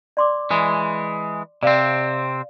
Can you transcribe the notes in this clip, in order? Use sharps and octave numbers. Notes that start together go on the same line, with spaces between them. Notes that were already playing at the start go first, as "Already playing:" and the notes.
D5 C6 D6
E3 G#3
C3 C4 D5 F5